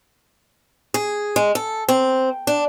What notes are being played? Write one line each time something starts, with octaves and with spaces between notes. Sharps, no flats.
G#4
G#3
A4
C4
D4